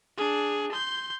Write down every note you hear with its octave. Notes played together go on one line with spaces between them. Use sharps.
D4 G#4
C6 G6